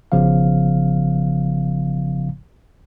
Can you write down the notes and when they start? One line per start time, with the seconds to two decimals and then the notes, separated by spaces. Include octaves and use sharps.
0.12 G#1 C#3 F3 B3 F5